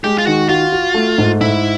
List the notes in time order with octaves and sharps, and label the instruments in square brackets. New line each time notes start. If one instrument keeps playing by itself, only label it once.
[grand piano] G#3 [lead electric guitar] G4
[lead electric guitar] F4
[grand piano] D#3 [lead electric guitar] F#4
[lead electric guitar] F4 [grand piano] F#4
[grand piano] F#4
A3
G#2
[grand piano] G#2 [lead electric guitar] E4